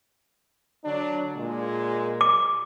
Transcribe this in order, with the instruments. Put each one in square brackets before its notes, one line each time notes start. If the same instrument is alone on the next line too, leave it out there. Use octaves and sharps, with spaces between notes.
[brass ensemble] D3 F#3 D4
A#2 G#3
[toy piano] D6